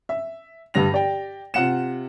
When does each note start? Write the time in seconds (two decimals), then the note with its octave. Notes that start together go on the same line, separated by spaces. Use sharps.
0.09 E5
0.74 G2 D3 G3 A#6 F7
0.92 G4 D5 G5
1.54 C3 F4 F#5 C#7 E7